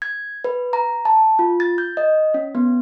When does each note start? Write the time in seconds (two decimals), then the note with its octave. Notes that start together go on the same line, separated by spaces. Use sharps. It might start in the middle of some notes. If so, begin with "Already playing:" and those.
0.02 G#6
0.44 B4
0.73 A#5
1.05 A5
1.39 F4
1.60 A6
1.78 G6
1.97 D#5
2.34 C#4
2.55 B3